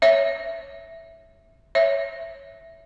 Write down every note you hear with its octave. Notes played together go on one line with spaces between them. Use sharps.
C#5 E5
C#5 E5